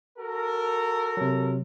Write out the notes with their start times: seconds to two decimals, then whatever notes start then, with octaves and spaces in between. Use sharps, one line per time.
0.18 F#4 A4 A#4
1.17 C3 F#3